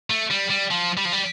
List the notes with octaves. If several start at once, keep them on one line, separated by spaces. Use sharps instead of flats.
A3
G3
G3
F3
G3
F3
G3